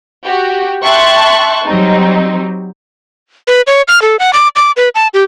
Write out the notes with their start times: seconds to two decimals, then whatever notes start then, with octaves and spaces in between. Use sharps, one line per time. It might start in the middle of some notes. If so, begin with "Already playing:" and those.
0.24 F#4 G4
0.83 E5 G5 A5 C6 C#6 F#6
1.66 F#3 G3 C4 D#4
3.47 B4
3.67 C#5
3.88 F6
4.02 A4
4.19 F#5
4.33 D6
4.56 D6
4.77 B4
4.95 A5
5.14 G4